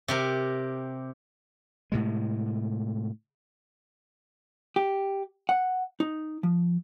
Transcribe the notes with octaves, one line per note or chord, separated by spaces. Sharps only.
C3 G4 A#4
A2 C3 G#3
G4
F#5
D#4
F3